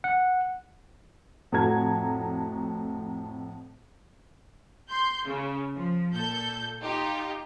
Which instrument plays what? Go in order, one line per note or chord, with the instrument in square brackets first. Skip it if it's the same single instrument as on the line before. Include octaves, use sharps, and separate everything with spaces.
[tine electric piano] F#5
[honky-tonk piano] F2 A2 F#4 A5 A#5 G#6
[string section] C6 G6
C#3
F3
A#2 A4 G6
D#4 F4 G4